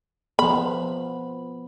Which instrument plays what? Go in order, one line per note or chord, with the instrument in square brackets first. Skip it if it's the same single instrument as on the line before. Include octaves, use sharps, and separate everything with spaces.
[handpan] F3 B3 [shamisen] B5